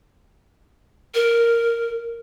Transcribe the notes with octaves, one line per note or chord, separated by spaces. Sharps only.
A#4